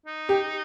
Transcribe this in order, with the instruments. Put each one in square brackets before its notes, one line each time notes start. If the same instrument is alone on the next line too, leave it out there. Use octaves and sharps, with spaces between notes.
[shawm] D#4
[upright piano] G4